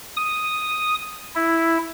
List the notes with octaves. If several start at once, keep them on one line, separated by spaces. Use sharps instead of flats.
D#6
E4